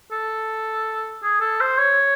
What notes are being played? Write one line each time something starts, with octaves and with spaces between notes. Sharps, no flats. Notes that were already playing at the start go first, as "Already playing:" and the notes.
A4
G#4
A4
C5
C#5